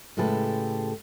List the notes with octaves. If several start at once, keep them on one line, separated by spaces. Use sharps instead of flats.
A2 C#3 G#3 G4 A4 B4